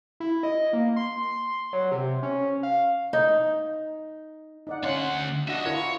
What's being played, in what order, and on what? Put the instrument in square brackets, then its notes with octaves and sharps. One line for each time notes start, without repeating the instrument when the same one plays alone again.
[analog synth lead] E4
D#5
A#3
C6
F#3
C3
C#4
F5
[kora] D#4
[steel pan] D#4 D5 F#5
[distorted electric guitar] D2 F#5 [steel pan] C#4 F5 C6
[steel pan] D4 F#4 F#5 [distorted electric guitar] D#5 E5
[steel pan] E4 F4 A#4 [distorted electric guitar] C#5